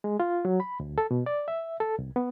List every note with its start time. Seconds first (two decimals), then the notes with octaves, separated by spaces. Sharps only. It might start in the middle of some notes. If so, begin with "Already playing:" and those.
0.04 G#3
0.20 F4
0.45 F#3
0.60 B5
0.80 D2
0.98 A4
1.11 B2
1.26 D5
1.48 E5
1.80 A4
1.98 C2
2.16 B3